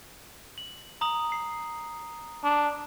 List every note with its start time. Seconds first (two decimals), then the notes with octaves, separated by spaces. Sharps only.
0.58 F#7
1.01 A#5 D#6 F#7
1.32 C7
2.44 D4